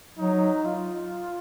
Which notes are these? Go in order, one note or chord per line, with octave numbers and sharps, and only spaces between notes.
F#3 D#4
F4